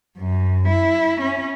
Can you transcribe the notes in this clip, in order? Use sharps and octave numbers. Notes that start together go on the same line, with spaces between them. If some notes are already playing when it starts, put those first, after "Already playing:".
F#2
E4
C#4